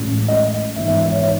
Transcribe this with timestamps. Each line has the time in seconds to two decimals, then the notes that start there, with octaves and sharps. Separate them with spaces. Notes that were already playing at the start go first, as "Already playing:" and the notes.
Already playing: A1 A2 G#3 C#4
0.28 D#5
0.76 G#1 G#2 E3 B3 E5
0.88 E5
1.00 E5
1.12 C#5
1.24 C#5